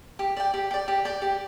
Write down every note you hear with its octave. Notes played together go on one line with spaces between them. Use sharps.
G4
D5 G5
G4
D5 G5
G4
D5 G5
G4